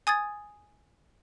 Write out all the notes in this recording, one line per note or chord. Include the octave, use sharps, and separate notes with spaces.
G#5 D#6 G#6 A6